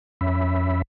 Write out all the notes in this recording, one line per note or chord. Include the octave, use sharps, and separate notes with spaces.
F2 C#4 E5 B5